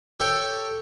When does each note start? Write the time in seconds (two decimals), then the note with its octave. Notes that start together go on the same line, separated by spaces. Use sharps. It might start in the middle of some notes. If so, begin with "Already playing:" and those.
0.20 G4 A4 C#5 G5